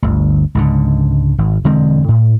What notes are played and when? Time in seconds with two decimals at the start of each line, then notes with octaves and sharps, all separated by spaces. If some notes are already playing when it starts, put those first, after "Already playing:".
0.02 G1 D2
0.55 C#2 G#2 D3
1.38 G#1
1.64 E1 D3 G#3 C4
2.08 A2